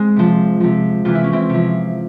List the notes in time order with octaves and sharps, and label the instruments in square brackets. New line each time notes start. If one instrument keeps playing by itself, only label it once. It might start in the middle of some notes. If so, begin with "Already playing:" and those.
Already playing: [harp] G#3 C4
C3 F3
C3 F3
C3 E3 F4
E4
C#4
C4 E4
C3 F3